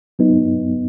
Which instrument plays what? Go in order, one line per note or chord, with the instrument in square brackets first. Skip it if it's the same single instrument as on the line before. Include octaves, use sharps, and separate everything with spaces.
[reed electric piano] F#3 B3 D#4